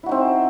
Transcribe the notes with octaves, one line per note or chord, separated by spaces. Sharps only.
C4 D#4 E4 F#4